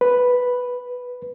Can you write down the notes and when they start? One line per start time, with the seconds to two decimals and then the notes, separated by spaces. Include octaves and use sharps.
0.01 B4